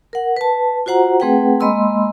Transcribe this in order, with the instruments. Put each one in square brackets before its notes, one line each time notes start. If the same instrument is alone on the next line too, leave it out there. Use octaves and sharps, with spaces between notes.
[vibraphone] A#4 F#5
B4 A5
F4 F#4 C5 F#5 A#5
A3 C4 G#4 B4 F#5 G5
G#3 A#3 D#5 B5 C6 E6